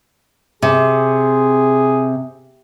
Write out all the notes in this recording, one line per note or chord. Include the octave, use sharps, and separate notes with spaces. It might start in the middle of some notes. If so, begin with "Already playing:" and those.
C3 G#4